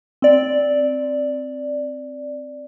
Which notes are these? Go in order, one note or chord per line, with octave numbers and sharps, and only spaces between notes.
C4 D5